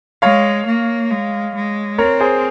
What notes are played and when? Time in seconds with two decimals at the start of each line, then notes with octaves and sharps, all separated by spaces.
0.22 G#3 C#5 F5
0.67 A#3
1.11 G#3
1.55 G#3
1.98 C4 A#4 C#5
2.20 G#4 C5